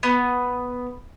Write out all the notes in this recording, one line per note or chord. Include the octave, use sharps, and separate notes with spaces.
B3